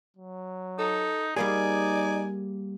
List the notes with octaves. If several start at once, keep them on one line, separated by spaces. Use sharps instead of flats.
F#3
D#4 A4
G3 A#3 D#4 G#4 D5 G#5